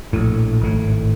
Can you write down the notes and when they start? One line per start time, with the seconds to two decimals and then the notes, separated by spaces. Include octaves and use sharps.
0.13 A#1 A2
0.61 G#1 A2